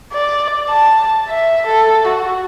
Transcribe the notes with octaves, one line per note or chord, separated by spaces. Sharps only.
D5
A5
E5
A4
F#4